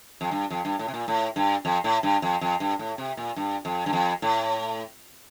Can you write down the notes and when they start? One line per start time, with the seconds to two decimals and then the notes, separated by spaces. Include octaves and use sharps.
0.21 F2
0.31 G2
0.50 F2
0.65 G2
0.79 A2
0.88 C3
0.94 A#2
1.08 A2
1.36 G2
1.65 F2
1.84 A2
2.03 G2
2.22 F2
2.41 F2
2.60 G2
2.79 A2
2.98 C3
3.17 A#2
3.36 G2
3.65 F2
3.86 G2
3.93 F2
4.22 A2